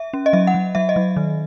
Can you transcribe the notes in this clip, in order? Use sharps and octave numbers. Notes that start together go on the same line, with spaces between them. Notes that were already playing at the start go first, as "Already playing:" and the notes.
Already playing: E5
C#4
D#5
F#3 E5
F#5
F#3
F#3 E5
D#5
F#3
D#3